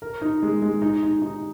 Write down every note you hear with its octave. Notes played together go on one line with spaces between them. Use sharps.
A#4
D#4
G#3
G#3
D#4
D#4
D#4